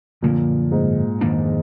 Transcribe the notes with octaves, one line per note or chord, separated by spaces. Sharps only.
F#2 A#2 D3 F3 A#3
G#2
F2 D#3 A#3 D4